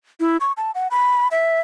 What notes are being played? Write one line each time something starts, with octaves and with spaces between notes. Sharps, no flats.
E4
C#6
A5
F#5
B5
E5